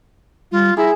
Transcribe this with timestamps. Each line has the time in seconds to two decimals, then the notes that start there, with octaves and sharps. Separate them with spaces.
0.52 G3 F4
0.77 E4 G#4 A#5